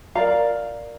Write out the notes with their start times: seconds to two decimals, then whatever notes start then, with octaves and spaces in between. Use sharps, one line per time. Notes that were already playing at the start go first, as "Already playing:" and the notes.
0.15 A#4 D5 F5 A#5